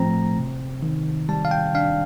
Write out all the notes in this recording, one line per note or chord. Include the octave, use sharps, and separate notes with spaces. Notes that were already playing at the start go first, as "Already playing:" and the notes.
Already playing: A2 F3 A3 C4 A#5
C3
D#3
G3 A5
F5
G5
D4 F5